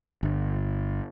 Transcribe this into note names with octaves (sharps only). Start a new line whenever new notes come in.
G1